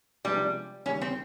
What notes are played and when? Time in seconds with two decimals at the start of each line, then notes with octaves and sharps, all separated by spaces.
0.25 C3 F3 G3 G#3 B3 D4
0.86 D#2 C#3 E3 G3 C#4
1.01 C4